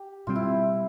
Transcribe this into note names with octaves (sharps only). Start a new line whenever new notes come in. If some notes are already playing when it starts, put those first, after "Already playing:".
Already playing: G4
B2 G3 C4 F4
E4